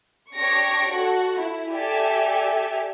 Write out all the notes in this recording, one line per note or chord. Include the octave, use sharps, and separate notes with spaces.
D4 G4 C#5 C#6 A#6 D7
F#4 A4
E4
G4 A4 D5 E5 G#5